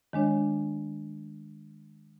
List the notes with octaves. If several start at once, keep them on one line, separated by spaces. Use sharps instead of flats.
D#3 G#3 D4 C#5